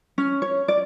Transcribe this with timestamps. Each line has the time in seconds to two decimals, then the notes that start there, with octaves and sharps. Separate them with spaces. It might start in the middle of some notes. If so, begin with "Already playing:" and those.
0.18 C#4
0.42 C#5
0.68 D5